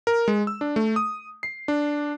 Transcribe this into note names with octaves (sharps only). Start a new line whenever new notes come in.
A#4
G#3
E6
D4
A3
D#6
C7
D4